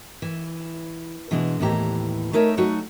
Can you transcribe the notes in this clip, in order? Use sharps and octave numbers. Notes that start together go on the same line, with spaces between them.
E3
B2 E3 G#3 D4
D#2 A2 E3 G4 A#5
A3 D#4 A#4 C#5 E5
F#3 A3 D#4 F#4